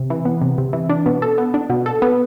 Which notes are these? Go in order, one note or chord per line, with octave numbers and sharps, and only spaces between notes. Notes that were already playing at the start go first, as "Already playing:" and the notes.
Already playing: C3
E3
B3
C3
C3
E3
D4
B2
A4
B3
D4
B2
A4
B3